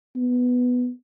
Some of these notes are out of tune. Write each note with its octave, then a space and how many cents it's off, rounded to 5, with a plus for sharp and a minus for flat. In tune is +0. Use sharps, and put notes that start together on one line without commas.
B3 +5